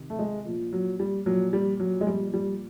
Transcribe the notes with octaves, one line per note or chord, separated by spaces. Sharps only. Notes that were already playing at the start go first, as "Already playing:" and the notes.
Already playing: C3 D#3
A3
G#3
A#2 F3
F#3
G3
A#2 F3 F#3
G3
F#3
G#3
A#2 F3 G3
G3